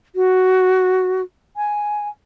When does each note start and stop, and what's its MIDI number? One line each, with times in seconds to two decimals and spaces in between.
0.15 1.21 66
1.56 2.08 80